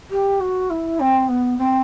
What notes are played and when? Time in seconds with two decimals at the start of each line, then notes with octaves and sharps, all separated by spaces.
0.11 G4
0.40 F#4
0.70 E4
1.00 C4
1.28 B3
1.58 C4